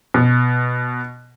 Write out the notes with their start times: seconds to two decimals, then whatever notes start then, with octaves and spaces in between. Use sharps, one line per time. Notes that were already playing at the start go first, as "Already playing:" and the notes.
0.14 B2